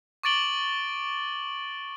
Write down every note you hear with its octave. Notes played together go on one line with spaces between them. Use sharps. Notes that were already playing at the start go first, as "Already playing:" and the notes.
C#6 D6 A6 D7 F#7 G7